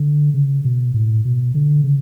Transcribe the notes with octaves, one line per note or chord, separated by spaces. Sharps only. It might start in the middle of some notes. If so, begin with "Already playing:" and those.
Already playing: D3
C#3
B2
A2
B2
D3
C#3